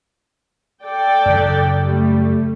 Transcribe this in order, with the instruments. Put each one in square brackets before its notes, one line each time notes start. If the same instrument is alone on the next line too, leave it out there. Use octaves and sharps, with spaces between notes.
[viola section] A4 D5 G5
[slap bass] F#2 C#3
[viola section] G3 A3